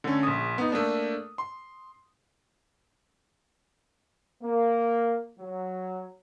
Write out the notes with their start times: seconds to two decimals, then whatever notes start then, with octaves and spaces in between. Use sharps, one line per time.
0.04 D3 A3 C#4
0.23 A#1 D#6
0.58 B3 D#4
0.72 A3 A#3 D4
1.38 C6
4.42 A#3
5.39 F#3